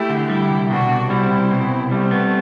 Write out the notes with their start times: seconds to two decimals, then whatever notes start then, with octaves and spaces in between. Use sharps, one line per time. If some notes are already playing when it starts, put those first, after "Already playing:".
Already playing: A3 E4 G4
0.09 D3
0.29 G3 E4 G4
0.50 C2
0.70 B2 D4 F#4
0.90 C2
1.10 G3 C4 E4
1.31 C2
1.51 B2
1.71 C2
1.91 G3 A3 C4
2.11 B3